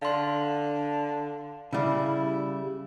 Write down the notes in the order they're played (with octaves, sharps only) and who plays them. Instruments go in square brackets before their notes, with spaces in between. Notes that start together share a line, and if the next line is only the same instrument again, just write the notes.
[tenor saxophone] D3 [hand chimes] F5 C6
[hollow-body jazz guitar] C#3 G3 [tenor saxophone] E4